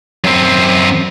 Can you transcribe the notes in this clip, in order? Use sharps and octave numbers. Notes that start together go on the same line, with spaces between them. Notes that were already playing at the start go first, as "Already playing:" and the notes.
F#2 C4